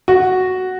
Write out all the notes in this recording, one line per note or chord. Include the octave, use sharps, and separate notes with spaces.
F#4